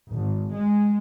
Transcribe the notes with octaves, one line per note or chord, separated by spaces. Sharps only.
G#1
G#3